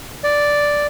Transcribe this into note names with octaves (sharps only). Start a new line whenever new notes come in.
D5